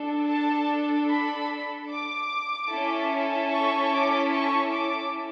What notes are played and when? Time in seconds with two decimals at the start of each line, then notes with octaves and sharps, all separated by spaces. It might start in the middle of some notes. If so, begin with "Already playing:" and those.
Already playing: D4 A4
0.29 A5
1.10 B5
1.90 D6
2.70 C#4 E4 A4
3.51 C#6
3.92 D6
4.31 C#6
4.71 D6